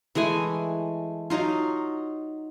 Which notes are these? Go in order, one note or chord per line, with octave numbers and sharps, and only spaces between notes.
E3 G#3 A3 G#5
F#3 D#4 F4